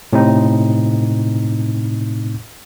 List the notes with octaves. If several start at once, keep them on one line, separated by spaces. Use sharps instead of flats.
A2 C3 C4 D#4